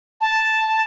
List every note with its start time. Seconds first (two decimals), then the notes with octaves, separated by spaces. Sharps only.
0.21 A5